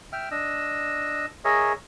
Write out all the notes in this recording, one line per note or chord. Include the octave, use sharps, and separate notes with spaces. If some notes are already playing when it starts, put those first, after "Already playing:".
E5 G5 F6
D4 D#5 E6
G#4 A#4 C#5 D#5 E5